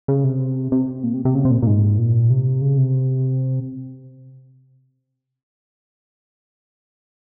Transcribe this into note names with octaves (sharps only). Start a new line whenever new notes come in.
C#3
C3
C3
A#2
C3
C3
C#3
C3
A#2
A#2
G#2
A#2
C3
C#3
C3